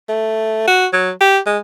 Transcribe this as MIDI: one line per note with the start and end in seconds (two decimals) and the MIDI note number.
0.09 0.65 57
0.67 0.86 66
0.93 1.11 54
1.21 1.39 67
1.46 1.58 56